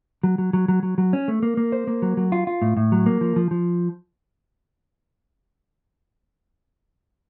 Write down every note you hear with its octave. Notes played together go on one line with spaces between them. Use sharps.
F#3
F#3
F#3
F#3
F#3
F#3
C#4
A3
A#3
A#3
C5
A#3
F#3
F#3
F4
F4
A2
A2
F#3
A#3
F3
F3
F3